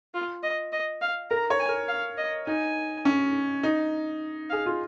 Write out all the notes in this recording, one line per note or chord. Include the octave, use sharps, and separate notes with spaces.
F4
D#5
D#5
F5
A#4 A#5
C#5
G#5
A#4
F5
D#5
D#4 G#5
C#4
D#4
G#4 F5
F4